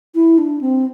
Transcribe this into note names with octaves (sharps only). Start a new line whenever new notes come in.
E4
D4
C4